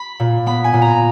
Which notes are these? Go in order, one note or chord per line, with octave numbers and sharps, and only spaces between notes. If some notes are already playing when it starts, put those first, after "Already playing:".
Already playing: B5
A#2
B3 B5
G#5
A#2
A#5